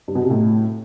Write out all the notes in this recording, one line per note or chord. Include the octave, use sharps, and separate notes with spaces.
G2
B2
C3
A2